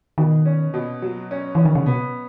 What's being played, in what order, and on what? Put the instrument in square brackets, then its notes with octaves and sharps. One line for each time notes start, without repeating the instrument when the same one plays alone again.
[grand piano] B2 [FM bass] D#3
[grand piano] C#4
B2
F#3
C#4
[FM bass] E3 [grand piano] C#4
[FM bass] D#3
C#3
[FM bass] B2 [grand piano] B3